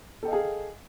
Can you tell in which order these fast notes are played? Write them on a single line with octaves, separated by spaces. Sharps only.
A4 G5 D#5 F5 G#4